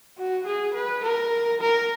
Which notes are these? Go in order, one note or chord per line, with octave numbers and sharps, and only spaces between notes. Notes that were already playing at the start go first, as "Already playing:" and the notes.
F#4
G#4
B4
A#4
A#4